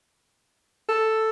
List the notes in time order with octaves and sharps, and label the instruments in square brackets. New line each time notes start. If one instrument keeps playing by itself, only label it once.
[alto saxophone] A4